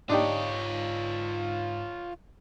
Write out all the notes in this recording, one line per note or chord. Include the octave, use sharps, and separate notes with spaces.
G#2 D4 D#4 F4 G4 C#5